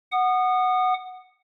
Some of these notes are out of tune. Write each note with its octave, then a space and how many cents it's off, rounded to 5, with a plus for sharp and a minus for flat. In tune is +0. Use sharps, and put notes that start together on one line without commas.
F#5 +0 D#6 -30